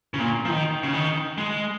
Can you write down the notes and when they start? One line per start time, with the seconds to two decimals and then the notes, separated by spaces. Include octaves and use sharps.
0.14 C#3
0.20 A#2
0.45 F3
0.49 D#3
0.83 C#3
0.93 D#3
1.38 G#3